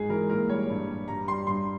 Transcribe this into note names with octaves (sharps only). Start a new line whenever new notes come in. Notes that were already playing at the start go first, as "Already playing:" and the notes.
Already playing: G#2 G#4
E3 A#4
A#2 A#4
G3 C#5
G2
G3
G2 A#5
G3 C6
G2 C6